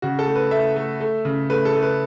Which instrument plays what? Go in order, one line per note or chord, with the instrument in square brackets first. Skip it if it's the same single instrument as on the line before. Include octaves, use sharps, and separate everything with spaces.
[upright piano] C#3 F#4
A4
A3
B4
A3 E5
A3
A3
C#3
A3 B4
A4
A3
B4